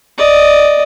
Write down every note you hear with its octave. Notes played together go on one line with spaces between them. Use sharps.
D5 D#5